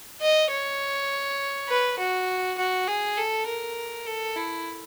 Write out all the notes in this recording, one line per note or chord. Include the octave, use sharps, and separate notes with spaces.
D#5
C#5
B4
F#4
F#4
G#4
A4
A#4
A4
E4